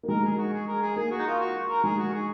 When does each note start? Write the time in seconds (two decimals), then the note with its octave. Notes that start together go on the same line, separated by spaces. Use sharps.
0.03 A#3
0.08 G#3 A#4
0.24 G#4
0.38 F#4
0.53 G#4
0.68 A#4
0.81 G#4
0.96 A#3 G#4
1.11 F#4
1.19 D#4
1.26 F4
1.40 F#4
1.69 A#4
1.83 G#3 G#4
1.98 F#4
2.14 G#4